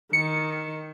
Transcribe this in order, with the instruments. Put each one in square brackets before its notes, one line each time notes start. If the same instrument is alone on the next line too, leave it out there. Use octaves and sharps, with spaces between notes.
[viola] D#3 [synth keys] C#7